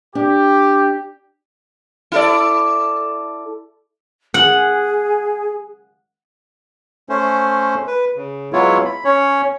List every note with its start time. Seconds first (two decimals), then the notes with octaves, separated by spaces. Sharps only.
0.15 D4 G4
2.12 E4 A4 D5
4.34 G#4 F#5
7.09 A3 C#4 C5
7.87 B4
8.16 C#3
8.53 F#3 G#3 B3 E4 F4 C#5
8.85 B5
9.04 C#4 C#5